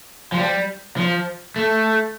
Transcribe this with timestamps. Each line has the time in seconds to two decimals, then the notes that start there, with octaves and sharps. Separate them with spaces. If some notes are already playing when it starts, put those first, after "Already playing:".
0.32 F3
0.37 G3
0.97 F3
1.56 A3